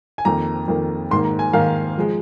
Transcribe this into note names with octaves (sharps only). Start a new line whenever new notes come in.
G#5
F2 D#3 A#3 A#5
F2 D#3 A#3
G#2 D#3 A#3 C6
A#5
G#5
G#2 D#3 A#3 F5
F3 G#3